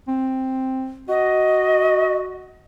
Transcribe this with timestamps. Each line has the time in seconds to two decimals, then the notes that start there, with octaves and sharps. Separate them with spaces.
0.08 C4
1.09 F#4 D#5